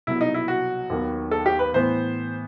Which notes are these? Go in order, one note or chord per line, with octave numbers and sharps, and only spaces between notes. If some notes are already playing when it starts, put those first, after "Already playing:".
C2 B2 F#3 E4
D#4
E4
F#4
D#2 D#3 F#3 B3
A4
G4
B4
A2 E3 B3 C5